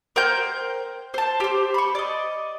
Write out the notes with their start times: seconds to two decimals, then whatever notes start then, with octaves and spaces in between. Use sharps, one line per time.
0.16 A#4 C5 G5 G6
1.14 C5 A5
1.40 G4 C5
1.74 B5 C#6
1.95 D5 D#5